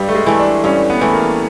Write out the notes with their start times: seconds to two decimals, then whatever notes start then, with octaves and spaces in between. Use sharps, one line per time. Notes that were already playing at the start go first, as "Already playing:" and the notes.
Already playing: G2 G3
0.09 A3
0.15 G#3
0.26 E3 A3
0.39 D4
0.64 G2 C#4
0.90 B3
1.01 E3 A3
1.13 A#3